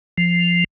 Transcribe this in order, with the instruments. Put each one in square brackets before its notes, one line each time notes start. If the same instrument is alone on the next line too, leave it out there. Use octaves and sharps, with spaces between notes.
[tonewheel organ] F3